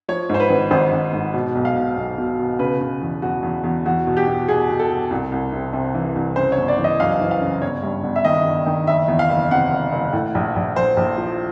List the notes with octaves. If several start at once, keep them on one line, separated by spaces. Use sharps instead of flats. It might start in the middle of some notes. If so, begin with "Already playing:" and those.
F3 C#5
G#2 C5
B4
G#1
G#1 C5
G#1
G#2
B2
B1
F5
B2
B1
B2
B2
C#3 B4
C#3
E2
E2 F#4
E2
E2
E2 F#4
B2
G4
B2
B2 G#4
B2
A4
B2
C2
C2
C3
C3
E3
C2
C#3 C5
C#5
G1
D5
E3
D#5
F#2 F5
E3
F5
C#3
G1 C#5
G2
G1
E5
D#3 D#5
G1
D#3
F#1 E5
E2
F5
F#1
C3 F#5
F#1
F#1
A2
A#1
A#1
A#1 C5
A#1
F3